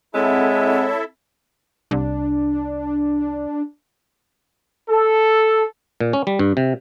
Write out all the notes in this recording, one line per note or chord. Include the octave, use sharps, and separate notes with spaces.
G#3 C4 E4 A4 C#5 E5 F#5
C2 D4
A4
A#2
C#4
G3
G2
C3